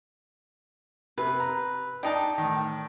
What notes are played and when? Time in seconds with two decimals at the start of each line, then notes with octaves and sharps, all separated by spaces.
1.18 C3 B4
1.40 A#5
2.03 D4 D#4 G5 A5
2.38 A2 D#3